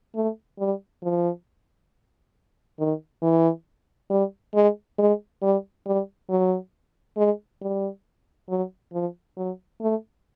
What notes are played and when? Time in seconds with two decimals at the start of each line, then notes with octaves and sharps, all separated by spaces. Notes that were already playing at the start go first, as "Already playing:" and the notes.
0.15 A3
0.59 G3
1.03 F3
2.79 D#3
3.22 E3
4.10 G3
4.54 G#3
4.98 G#3
5.42 G3
5.86 G3
6.29 F#3
7.17 G#3
7.61 G3
8.49 F#3
8.93 F3
9.37 F#3
9.81 A3